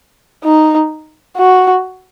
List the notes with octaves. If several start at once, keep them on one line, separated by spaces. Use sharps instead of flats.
D#4
F#4